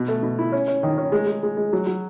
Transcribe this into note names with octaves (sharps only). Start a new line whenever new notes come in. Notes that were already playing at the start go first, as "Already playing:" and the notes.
Already playing: B2
A3
B2
E4
C#4
C#4
D#3
C#4
G#3
G#3
G#3
G#3
F#3
F#3